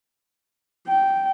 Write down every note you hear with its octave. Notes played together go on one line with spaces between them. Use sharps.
G5